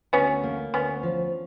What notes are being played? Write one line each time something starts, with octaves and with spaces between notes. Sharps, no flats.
D2 B3 C#4
A#3
D2 B3 C#4
F3